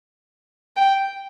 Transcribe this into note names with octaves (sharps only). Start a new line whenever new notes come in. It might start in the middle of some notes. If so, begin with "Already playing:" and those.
G5